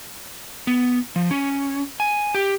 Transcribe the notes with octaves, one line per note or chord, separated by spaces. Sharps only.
B3
F3
C#4
G#5
G4